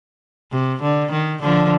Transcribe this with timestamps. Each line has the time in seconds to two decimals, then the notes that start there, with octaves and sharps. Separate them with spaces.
0.52 C3
0.82 D3
1.12 D#3
1.42 D3 F3